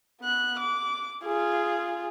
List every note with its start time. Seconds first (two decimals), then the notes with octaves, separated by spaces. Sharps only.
0.21 B3 F#6
0.60 D6
1.24 F4 G#4